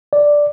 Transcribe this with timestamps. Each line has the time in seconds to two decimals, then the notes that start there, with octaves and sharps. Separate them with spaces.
0.13 D5